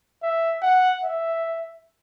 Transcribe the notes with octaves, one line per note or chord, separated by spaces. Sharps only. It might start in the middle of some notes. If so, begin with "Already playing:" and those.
E5
F#5
E5